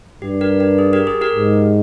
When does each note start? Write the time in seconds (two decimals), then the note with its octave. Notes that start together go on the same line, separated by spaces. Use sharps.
0.22 G2 G4
0.41 G4 A#4
0.60 G4 A#4
0.79 G#4
0.93 G4 A#4
1.07 G#4
1.21 G4 A#4
1.36 G#2